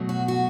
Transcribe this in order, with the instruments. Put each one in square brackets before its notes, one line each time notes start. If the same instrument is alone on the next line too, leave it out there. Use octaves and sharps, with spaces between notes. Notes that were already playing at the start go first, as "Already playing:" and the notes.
Already playing: [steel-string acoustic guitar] B2 F#3 A3
F#4
F#4